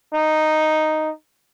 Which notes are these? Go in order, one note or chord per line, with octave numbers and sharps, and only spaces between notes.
D#4